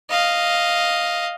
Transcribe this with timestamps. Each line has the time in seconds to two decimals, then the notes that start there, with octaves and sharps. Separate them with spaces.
0.10 D#5 F5